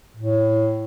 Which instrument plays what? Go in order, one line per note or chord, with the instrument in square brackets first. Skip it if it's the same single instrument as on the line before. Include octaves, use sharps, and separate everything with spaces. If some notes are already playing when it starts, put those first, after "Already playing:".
[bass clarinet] A2